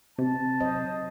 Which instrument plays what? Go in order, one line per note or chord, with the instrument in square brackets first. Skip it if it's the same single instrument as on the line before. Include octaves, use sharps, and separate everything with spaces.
[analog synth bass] C3 [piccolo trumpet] A5
[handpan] F#3 C5 D#5